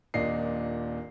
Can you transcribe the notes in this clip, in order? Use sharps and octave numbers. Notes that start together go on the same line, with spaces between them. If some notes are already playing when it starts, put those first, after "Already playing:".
D#1 A#2 D4 D#5 C7